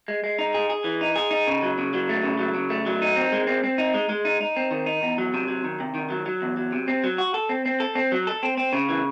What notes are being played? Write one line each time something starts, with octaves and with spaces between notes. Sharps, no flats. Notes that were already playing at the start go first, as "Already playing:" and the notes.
G#3
G#3
D#4
G#4
G#4
E3
D#4
G#4
D#4
C#3
F#3
C#3
F#3
A3
C#3
F#3
C#3
A3
F#3
D#4
C4
G#3
C4
C4
D#4
G#3
G#3
D#4
D#4
C4
D#3
D#4
E2
F#3
C3
F#3
D#3
C3
D#3
F#3
F#3
E2
F#3
C3
C4
F#3
F#4
A4
C4
C4
A4
C4
F#3
A4
C4
C4
C#3
E3